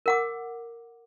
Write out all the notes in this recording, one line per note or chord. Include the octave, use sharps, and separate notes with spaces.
A#4 F#5 D6